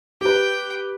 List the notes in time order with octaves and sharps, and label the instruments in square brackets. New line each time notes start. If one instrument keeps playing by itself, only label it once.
[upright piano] G4 B4 [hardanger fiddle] G5